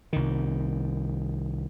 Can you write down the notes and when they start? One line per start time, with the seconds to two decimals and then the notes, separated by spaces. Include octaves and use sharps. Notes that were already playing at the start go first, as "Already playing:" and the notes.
0.13 C2 D#3